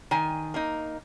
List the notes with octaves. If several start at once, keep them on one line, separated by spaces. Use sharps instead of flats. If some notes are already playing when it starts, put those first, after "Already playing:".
D#3 G#5
A#3 D#4